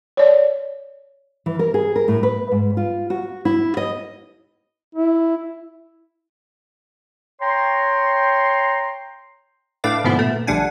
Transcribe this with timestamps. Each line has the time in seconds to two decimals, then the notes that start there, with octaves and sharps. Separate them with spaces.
0.17 C#5 D5
1.46 E3
1.59 A#4
1.74 G#4
1.96 A#4
2.08 A2
2.23 B4
2.52 G#2
2.77 F4
3.10 F#4
3.45 E4
3.77 D#5
4.95 E4
7.41 C#5 G5 A#5 C6
9.84 A2 A3 D4 B4 F5 D6
10.04 G#2 B2 D3 F3 B3 E4
10.18 A#2 A3
10.47 A#1 D3 G3 D4 F#5 G#5